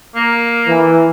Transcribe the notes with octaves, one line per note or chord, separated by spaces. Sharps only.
A#3
E3